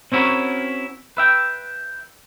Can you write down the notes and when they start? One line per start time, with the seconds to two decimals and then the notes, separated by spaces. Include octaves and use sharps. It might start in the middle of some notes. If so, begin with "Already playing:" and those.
0.12 C4 C#4 E4 F#4 A#4 C#5
1.17 B4 E5 G5